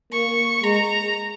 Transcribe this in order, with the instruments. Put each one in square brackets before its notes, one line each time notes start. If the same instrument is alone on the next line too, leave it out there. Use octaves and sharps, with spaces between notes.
[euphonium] A#3 [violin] C#6
[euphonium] G#3 [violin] A#5